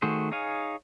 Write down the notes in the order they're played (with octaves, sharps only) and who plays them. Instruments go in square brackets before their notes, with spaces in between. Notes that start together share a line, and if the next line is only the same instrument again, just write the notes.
[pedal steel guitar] D#3 A3 F#4 G#4 C5
D#4 G#4 C#5 F5 G#5